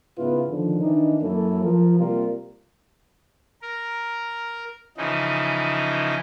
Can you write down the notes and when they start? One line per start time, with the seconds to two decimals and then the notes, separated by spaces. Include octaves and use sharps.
0.18 G#2 C#3 B3 E4 F4 B4
0.50 D3 D#3 F3
0.81 D#3 E3 D4 D#4
1.22 F#2 F#3 A#3 C#4 E4 A4
1.64 F3 A#4
1.99 C3 G3 A#3 F4 A#4
3.62 A#4
4.97 C#3 E3 F3 D#4